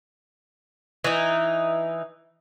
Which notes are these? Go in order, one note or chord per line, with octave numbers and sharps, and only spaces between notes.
E3 D#4